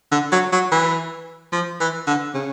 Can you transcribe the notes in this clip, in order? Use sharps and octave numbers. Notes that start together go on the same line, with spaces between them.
D3
F#3
F#3
E3
F3
E3
D3
C#3